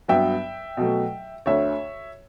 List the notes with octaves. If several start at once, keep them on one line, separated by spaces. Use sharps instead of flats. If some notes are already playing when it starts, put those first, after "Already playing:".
G2 F#3 B3 E5 G5
B2 F#3 A3
D2 D3 A3 C#5 E5